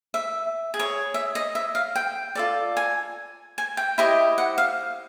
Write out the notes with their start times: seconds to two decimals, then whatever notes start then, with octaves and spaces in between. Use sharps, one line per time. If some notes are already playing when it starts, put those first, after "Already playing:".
0.14 E5
0.74 G#4
0.79 C#5
1.14 E5
1.35 D#5
1.55 E5
1.75 F5
1.95 G5
2.35 F4 A4 D5
2.77 G#5
3.58 G#5
3.77 G5
3.98 E4 G4 C5 D#5
4.38 F#5
4.58 F5